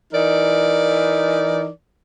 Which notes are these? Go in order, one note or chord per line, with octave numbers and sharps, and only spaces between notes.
E3 D#4 A#4 D5